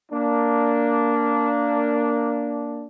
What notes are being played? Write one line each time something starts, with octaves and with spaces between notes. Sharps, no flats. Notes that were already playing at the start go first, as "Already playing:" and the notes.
A#3 D4